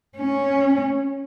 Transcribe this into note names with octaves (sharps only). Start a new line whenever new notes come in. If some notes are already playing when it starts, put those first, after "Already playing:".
C#4